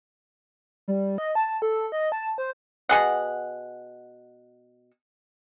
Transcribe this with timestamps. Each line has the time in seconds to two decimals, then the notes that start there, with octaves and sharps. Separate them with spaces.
0.88 G3
1.18 D#5
1.35 A5
1.62 A4
1.92 D#5
2.12 A5
2.38 C5
2.89 B2 G#4 F#5